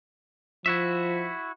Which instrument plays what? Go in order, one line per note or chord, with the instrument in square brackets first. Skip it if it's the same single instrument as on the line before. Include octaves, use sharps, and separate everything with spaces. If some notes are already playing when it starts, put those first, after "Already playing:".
[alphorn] F3 [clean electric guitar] E4 F#4 E5